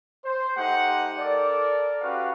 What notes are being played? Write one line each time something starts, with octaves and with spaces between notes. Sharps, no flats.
C5
A3 D#4 G4 C5 F#5
A4 A#4 D5
C#4 F#4 G4 B4 F5